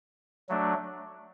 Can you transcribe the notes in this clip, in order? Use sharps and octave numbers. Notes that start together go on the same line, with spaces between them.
F#3 A3 D4